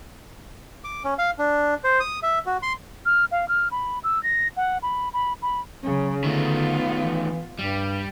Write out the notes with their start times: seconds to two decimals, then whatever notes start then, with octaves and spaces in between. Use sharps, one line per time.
0.84 D6
1.04 C#4
1.19 F5
1.39 D4
1.84 C5
2.00 D#6
2.23 E5
2.46 F#4
2.63 C6
3.06 F6
3.31 F5
3.48 F6
3.71 B5
4.04 E6
4.23 A#6
4.57 F#5
4.82 B5
5.13 B5
5.42 B5
5.83 C#3 F#3
6.24 D3 D#3 A3 B3 F4
7.02 E3
7.59 G2 G3